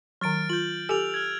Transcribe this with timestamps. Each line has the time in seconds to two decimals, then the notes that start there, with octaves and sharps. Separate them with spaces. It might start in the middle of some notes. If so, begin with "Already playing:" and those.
0.21 D#3 F#3 F6 A6 D7
0.49 F4 G6 F#7
0.89 G4 A4 G#5 E6 F7
1.14 F6 G#6